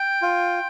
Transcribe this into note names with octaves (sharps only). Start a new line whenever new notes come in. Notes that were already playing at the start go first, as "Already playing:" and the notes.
Already playing: G5
F4